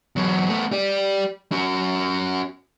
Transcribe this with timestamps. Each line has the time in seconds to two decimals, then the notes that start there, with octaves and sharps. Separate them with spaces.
0.16 E2 F#3
0.49 A3 B3
0.72 G4 D5
1.52 C#4 F#4